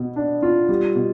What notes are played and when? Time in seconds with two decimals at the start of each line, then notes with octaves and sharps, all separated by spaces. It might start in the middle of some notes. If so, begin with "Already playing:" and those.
Already playing: B2 B3
0.16 D4
0.42 F4
0.69 G3
0.95 B2